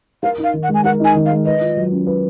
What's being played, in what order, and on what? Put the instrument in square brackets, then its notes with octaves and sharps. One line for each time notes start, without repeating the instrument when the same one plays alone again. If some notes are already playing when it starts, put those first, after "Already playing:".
[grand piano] A#4 [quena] F5
[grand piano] D#4
[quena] F5
[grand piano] D#3
[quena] F#5
[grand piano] G#3
[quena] G#5
[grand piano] A#4 [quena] F#5
[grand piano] D#4 [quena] G#5
[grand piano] D#3
[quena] F5
[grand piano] G#3
[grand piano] B4 [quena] D#5
[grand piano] F4
F#3
C#4
B4